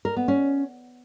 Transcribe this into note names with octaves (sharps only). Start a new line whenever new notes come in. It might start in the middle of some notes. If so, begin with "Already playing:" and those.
A#4
B3
C#4